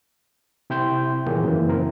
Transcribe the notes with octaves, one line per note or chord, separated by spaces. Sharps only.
C3 E4 G5 C6 G6
A#2 D#3 E3 F#3 A#3 G#4
F#2 C#3 E3
C4 E4 A#4